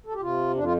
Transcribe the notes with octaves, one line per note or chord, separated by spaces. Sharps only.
A4
G4
C3 F4
F2 D4
F4